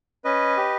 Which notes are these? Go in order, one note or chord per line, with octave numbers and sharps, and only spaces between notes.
C#4 B4 D#5
G4